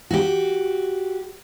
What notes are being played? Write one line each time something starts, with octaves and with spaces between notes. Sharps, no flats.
F#4 G4